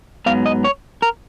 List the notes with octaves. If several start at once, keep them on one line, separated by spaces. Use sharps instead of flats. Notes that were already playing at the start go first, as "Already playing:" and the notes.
G#2 F#3 B3 F5
D#5
C#5
A#4